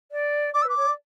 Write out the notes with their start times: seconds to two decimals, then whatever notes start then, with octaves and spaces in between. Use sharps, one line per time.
0.12 D5
0.54 D5 D6
0.62 E6
0.65 B4 D6
0.77 C#5
0.87 D5